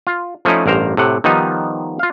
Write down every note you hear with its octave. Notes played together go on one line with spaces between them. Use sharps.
F4
F3 A3 C#4 D#4 E4
A1 G2 A#4 C5 A#5
A2 C3 F#5
D#3 F3 G3 B3 D#4
F4 F5